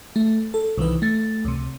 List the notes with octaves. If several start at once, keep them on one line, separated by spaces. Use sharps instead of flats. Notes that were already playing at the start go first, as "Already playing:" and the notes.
A3
A4
C2 D#3 E3 B4
A3 A6
C#2 C3